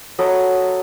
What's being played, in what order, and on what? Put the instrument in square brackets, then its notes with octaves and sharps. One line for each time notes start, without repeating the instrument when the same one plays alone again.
[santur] F#3 A4 D#5 B5